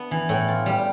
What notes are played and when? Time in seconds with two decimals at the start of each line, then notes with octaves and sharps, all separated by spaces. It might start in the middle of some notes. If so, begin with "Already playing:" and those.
Already playing: A3 B3 D4
0.11 E3
0.29 A2
0.48 F4
0.66 G3